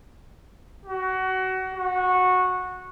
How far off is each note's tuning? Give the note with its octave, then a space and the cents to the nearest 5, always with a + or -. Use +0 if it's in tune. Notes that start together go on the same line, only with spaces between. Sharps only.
F#4 +25
F#4 -15